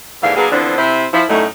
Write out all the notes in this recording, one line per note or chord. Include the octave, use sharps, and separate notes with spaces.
D#2 G#2 D3 E3 F5
F#3 A#3 B3 D4 G#4
D3 E3 F3 B3 C4 D4
C3 E4 C5
F3 E4
F#2 A2 D3 F#3 A3 D#4